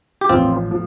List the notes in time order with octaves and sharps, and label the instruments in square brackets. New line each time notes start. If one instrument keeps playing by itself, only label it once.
[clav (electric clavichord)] G4
[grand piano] A1 A2 F3 [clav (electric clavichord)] C4 F4
[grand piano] A2 F3